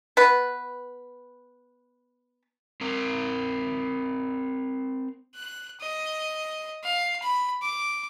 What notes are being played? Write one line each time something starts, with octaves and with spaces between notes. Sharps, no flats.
B3 B4
C4 A#4
F#6
D#5
F5
B5
D6